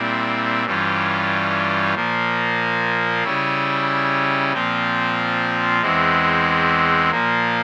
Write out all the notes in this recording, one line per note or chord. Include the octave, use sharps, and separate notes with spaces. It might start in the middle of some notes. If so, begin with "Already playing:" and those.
Already playing: A#2 G3 C4 E4
G2 E3 G3 C#4 F4
A#2 F3 A#3
C#3 G3 C#4 E4
A#2 F3 C4 F4
E2 E3 G#3 C4
A#2 F3 A#3